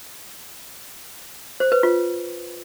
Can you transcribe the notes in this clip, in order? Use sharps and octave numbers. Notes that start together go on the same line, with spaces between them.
C5
B4
F4